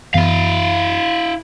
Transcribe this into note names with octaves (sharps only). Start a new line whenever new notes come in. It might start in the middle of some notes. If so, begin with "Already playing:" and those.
F#2 E3 B3 E4 F5